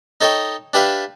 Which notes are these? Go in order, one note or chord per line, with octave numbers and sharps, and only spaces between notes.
D#4 A4 C#5 D#5 G5
D4 G4 B4 E5 F5 A5